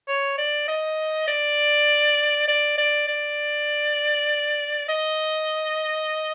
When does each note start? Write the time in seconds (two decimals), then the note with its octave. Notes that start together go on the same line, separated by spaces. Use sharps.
0.08 C#5
0.38 D5
0.68 D#5
1.28 D5
2.48 D5
2.78 D5
3.08 D5
4.89 D#5